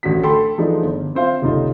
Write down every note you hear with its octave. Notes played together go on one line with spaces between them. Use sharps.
A1 D2 D3 F#4 B6
A4 G5 B5 C6
E3 F3 G#3 A3 D4 D#4
G1
C4 F4 C5 E5 F5
F#1 C2 D#4 F4 A4